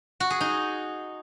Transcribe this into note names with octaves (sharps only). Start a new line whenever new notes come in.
F#4
G#4
D#4